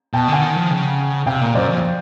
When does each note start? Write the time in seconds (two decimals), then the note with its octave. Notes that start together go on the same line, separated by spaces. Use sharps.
0.13 B2 G5 A5
0.28 D3 F#5 G#5
0.41 D#3
0.56 F3
0.71 C#3
1.26 C3 F5 G5
1.41 A#2
1.55 F#2 C5 D5
1.70 F2